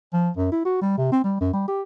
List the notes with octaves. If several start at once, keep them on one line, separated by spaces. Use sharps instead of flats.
F3
F#2
E4
F#4
G3
C3
C4
G3
F#2
G3
G4